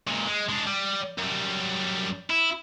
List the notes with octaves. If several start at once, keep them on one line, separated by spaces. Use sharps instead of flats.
C#2 A#2
G#3
G#3 D4
G3
F#2 G3
E4